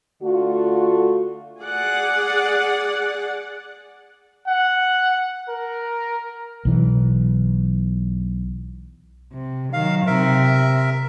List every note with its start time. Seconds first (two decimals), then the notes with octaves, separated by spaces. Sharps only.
0.22 D3 A3 F4 F#4
1.61 G#4 D5 F#5
4.47 F#5
5.49 A#4
6.65 B1 E3
9.33 C3
9.73 D#3 F#3 F5
10.07 C3 A#4 E5